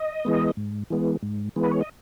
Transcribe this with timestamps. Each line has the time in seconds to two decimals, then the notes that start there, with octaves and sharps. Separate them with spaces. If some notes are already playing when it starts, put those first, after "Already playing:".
Already playing: D#5
0.25 E3 G#3 B3
0.57 G#2
0.90 E3 G#3 B3
1.23 G#2
1.56 E3 G#3 B3
1.63 B4
1.71 C#5
1.81 D#5